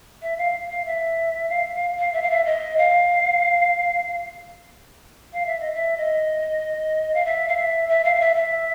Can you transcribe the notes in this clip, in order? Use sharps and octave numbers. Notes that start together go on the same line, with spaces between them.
E5
F5
F5
E5
F5
F5
F5
E5
F5
E5
D#5
F5
F5
E5
D#5
E5
D#5
F5
E5
F5
E5
E5
F5
F5
E5
E5